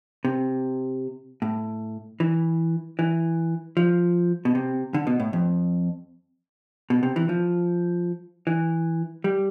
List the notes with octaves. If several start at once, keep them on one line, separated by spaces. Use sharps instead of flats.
C3
A2
E3
E3
F3
B2
C3
D3
B2
A2
F2
B2
C3
E3
F3
E3
G3